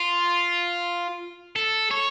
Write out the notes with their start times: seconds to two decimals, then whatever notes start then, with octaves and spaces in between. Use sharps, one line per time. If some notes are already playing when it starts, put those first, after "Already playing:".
Already playing: F4
1.56 A4
1.91 C#5